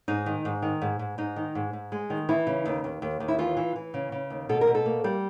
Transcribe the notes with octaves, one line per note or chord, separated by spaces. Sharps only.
G#2 D#4
D#3
G#2
D#3
G#2
G#2
G#2 D#4
D#3
G#2
G#2
G#3
D#3
E3 E4
C#3
D#2
D#2
D#2
D#2
E4
E3 F4
E3
E3
C#3
C#3
D#2
B2 A4
A#4
B2
A4
A#3
G3